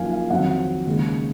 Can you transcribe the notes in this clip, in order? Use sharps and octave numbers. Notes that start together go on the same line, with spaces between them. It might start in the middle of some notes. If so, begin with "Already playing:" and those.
Already playing: F#2 F3 A#3 D#4 F5 G#5
F5
F2 D#3 F#3 C4 F#5
D#2 C#3 G#3